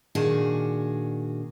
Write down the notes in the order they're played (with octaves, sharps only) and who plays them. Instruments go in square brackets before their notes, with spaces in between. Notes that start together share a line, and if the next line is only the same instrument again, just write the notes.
[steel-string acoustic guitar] A#2 D#3 D4 F#4 G#4 A5